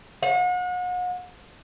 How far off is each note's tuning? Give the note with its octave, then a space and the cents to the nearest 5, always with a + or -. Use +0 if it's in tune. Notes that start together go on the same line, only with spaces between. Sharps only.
F#5 -40